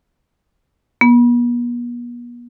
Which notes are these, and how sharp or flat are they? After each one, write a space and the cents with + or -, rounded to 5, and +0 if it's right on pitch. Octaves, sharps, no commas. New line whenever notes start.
B3 -45